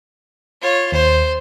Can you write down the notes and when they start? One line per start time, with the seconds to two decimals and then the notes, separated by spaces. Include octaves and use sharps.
0.62 F4 C#5
0.92 D#2 C5